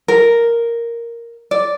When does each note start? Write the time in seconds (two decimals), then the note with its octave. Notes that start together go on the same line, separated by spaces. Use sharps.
0.08 A#4
1.51 D5